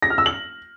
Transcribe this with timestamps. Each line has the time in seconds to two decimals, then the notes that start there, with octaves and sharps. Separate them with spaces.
0.02 A#6
0.10 F6
0.18 E6
0.26 F#7